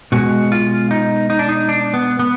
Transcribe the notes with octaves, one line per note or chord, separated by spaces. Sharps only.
B2 G#3 F#4
F4
D#4
D#4
D4
D#4
D4
B3
B3